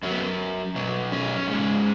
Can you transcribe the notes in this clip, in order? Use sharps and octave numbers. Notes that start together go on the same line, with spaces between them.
F#2 F#3 C#4
B3
B2 F#3
C#4
G#2 G#3